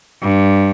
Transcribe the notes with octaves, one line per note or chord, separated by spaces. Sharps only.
G2